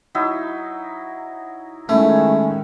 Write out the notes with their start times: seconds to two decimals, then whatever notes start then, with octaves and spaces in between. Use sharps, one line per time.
0.15 F#3 D#4 E4
1.89 D#3 G#3 A3 C#4 E4